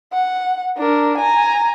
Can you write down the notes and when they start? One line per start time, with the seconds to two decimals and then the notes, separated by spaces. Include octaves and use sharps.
0.13 F#5
0.78 D4 A#4
1.18 G#5 A#5